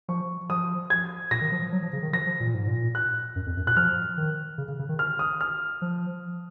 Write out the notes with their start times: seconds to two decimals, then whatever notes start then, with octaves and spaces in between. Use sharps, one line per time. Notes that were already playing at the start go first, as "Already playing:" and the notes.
0.09 F3 C#6
0.50 F3 D#6
0.90 G#6
1.31 A#2 A#6
1.41 D#3
1.52 F3
1.62 F3
1.72 F#3
1.83 F3
1.93 C#3
2.02 D#3
2.13 F3 A#6
2.27 F3
2.40 A#2
2.54 G#2
2.68 A#2
2.95 F#6
3.36 F#2
3.46 F2
3.57 F#2
3.66 A#2 F#6
3.76 F3 F6
4.17 D#3
4.58 C#3
4.68 C#3
4.79 C#3
4.89 D#3
4.99 F6
5.19 D#6
5.41 F6
5.82 F3